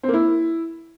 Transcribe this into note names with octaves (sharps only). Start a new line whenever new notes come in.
C4
A#3
E4